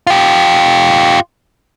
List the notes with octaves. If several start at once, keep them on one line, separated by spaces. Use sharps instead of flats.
F4 G4